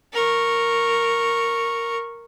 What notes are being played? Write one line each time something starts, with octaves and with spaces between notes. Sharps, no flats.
A#4 C#6